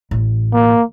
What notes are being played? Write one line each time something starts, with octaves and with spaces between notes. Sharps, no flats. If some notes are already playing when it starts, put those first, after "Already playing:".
A1
A#3